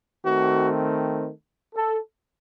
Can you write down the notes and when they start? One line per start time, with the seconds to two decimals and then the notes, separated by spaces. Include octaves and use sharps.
0.24 D#3 A3 C4 F#4
1.75 A4